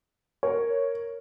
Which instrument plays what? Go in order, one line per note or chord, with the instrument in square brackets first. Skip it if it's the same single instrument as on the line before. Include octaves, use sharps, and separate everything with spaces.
[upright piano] A#4 [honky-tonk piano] C#5